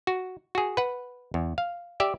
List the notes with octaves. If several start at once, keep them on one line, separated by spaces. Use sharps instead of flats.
F#4
F#4 G#4
B4 F#5
E2
F5
G4 D5 E5